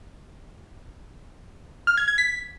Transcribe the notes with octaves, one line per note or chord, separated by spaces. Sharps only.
F6
G#6
G#6
B6